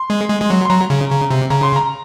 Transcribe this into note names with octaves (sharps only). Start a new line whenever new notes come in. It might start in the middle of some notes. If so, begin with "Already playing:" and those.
Already playing: C6
G#3
G#3
G#3
F#3
C6
F#3 A#5
C#3
C#3
C3
C#3 A#5
C6
A#5